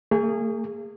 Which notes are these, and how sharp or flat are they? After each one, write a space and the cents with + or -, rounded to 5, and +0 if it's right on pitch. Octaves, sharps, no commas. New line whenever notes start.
A3 +45 G#4 -20